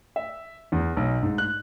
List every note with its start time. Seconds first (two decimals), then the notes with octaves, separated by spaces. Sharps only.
0.16 E5
0.72 E2
0.97 B1
1.23 G#2
1.38 F#6